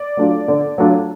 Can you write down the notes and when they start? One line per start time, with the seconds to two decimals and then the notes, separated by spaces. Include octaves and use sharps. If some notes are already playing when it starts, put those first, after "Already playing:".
Already playing: D5
0.17 F#3 A3 D4 F4
0.48 D3
0.78 F#3 A3 D4 F4